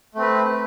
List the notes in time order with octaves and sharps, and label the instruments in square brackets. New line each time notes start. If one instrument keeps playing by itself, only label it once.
[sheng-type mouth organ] A3
C4
B4